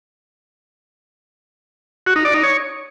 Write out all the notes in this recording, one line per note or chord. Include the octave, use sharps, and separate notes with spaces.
F#4
D#4
D5
D#4
C#5